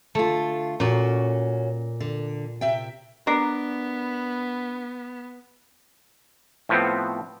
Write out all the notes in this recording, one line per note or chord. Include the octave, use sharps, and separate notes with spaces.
D3 A3 F4
A#2 C#4 F#4
D3
C3 E5 G5
B3 D4 A#4
A2 F3 B3 C4